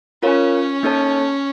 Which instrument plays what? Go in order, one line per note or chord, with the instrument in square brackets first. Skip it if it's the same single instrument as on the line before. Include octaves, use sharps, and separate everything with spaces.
[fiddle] C#4 [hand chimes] F4 A#4 C#5 F5
[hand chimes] A#3 D#4 A4 C#5 A5